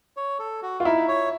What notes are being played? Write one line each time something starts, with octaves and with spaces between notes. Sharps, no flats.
C#5
A4
F#4
F4
D#4 E4
C#5